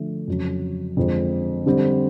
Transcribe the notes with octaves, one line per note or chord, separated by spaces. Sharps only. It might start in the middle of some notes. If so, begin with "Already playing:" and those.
Already playing: D3 F3 A3
F2 C#3 F#3
F2 D3 F3 G#3 C4
D3 G3 C4